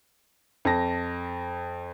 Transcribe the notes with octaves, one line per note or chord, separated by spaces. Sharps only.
F2 A5 A#6